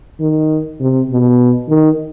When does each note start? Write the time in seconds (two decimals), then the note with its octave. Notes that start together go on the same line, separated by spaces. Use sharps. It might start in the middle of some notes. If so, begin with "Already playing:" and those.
0.20 D#3
0.80 C3
1.11 B2
1.69 D#3